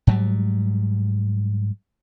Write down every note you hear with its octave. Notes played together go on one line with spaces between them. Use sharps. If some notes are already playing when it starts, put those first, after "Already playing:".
G#2 F#3 G3